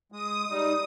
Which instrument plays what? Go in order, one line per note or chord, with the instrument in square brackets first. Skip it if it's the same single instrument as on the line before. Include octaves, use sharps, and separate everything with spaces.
[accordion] G#3 [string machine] D#6
[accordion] G3 D#4